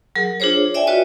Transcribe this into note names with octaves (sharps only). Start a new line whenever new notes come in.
F#3 G#4 A#4
D4 F4 G#4 C5 C#5
D5 E5 G5 G#5
F4 F#4 B4 C#5 D#5 G5